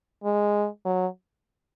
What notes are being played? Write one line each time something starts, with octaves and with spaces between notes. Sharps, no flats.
G#3
F#3